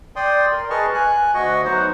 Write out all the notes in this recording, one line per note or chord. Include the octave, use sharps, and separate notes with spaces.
D5 G5 C6 D#6
A#4
G#4 B4 D#5 A5 C#6 F6
G#5 F#6
D2 F#4 D#5 C#6
F#3 B3 D#4 C5 F#5